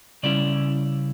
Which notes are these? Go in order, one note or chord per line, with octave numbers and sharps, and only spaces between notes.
C#3 G3 C#4 E4 D5